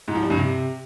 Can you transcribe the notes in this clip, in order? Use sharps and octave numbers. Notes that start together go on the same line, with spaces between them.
G#2
F3
G3
G2
C3